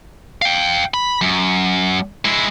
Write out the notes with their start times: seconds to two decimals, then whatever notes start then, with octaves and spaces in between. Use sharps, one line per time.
0.42 F5 G5
0.94 B5
1.21 F#2
2.25 G#3 E4